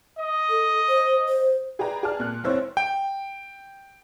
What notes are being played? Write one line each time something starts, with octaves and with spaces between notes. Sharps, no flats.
D#5
A4
C5
C5
G#4 B4 D5 G5 A#5
G#4 D5 A5 F6
A#2 F#6
F1 C4 E4 C5 C#5 E6
G5